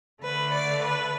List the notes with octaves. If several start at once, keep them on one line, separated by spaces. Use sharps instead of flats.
D3 A3 B4
D5
B4